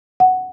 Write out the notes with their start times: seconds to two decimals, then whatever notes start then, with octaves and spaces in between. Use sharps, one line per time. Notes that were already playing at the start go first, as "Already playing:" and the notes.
0.20 F#5